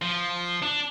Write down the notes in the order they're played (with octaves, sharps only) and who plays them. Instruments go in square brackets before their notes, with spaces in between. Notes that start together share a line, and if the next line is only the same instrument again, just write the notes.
[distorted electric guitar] F3
D4